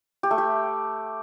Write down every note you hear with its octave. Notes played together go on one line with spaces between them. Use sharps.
G4
A3
G4